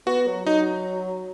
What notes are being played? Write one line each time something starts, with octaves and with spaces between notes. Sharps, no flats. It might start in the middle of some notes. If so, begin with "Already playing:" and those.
B3 F#4
F#3
F#3 D#4